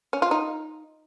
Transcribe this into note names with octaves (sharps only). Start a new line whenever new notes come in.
C#4
F4
D#4